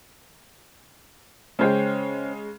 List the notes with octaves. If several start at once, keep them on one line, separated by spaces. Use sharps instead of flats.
C#3 G#3 C#4 C5 G5